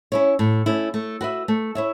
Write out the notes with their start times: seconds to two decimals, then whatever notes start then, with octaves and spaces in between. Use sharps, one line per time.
0.12 C#4 E4 C#5
0.39 A2
0.66 A3 C#4 E4
0.94 A3
1.21 F#4 B4 E5
1.48 A3
1.75 E4 C#5 E5